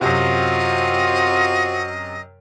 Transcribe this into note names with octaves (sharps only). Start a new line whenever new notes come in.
F#2 C3 C4 F4 F#4 D#5